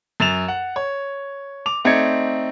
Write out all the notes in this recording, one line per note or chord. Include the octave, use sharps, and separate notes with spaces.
F#2 A6 E7 F7
F#5
C#5
D6 F7
A3 C4 D#4 D5 G#6 C#7